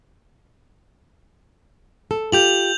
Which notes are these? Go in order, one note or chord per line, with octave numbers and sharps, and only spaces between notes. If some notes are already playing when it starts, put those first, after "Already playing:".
A4
F4 G4 G6 F7 F#7